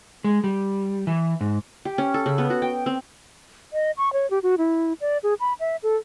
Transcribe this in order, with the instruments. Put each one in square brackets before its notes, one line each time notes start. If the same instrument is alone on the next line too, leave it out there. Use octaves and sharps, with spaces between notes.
[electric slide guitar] G#3
G3
E3
G#2
[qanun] G4
C#4
A4
C#3
B3
F#4
G5
C4
[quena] D#5
C#6
C#5
G4
F#4
E4
D5
G#4
B5
E5
A4